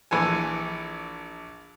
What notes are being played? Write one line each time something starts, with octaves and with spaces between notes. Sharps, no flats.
A#1 E3 A4 G#5